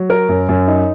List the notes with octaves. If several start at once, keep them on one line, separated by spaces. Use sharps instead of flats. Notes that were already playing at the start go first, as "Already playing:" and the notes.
Already playing: F#3
A#4
F#2
F#2
D#4